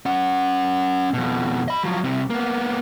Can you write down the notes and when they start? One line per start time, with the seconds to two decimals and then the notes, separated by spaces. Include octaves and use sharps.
0.06 C#4 F#5
1.14 F2 B2
1.68 D#5 B5
1.83 F3 F#3
2.04 C2 C3
2.30 A#3 B3